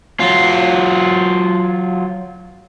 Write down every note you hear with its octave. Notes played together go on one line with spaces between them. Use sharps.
F#3 F4